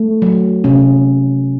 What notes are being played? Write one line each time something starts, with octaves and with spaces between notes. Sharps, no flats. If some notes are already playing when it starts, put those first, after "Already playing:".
Already playing: A3
F#3
C3 C#4